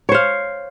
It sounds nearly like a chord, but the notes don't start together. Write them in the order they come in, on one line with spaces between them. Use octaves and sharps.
C#5 C5 F5